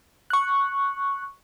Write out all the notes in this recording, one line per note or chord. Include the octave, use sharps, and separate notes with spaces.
C#6 F#6